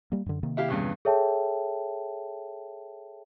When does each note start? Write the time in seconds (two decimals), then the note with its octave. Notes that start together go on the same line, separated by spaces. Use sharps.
0.12 G3 A#3
0.26 F#2 D3
0.43 C3 D#3 A#3
0.57 E4 G4 F5
0.69 E2 G2 C#3
1.05 G#4 A4 C#5 E5 G5 A5